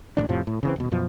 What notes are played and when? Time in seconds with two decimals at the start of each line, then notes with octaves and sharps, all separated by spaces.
0.17 A1 A2 E3 D4
0.29 F2 A2 C3 F3
0.47 A2
0.63 C#3 E3 C4
0.76 D#1 B2
0.92 F#2 B2 F3